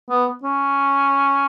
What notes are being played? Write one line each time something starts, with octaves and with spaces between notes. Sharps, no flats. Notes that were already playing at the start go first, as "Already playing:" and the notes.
B3
C#4